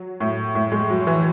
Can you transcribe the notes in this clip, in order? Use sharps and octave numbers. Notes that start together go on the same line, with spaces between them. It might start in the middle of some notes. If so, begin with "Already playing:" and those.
Already playing: F#3
A2
A2
G#3
F#3
E3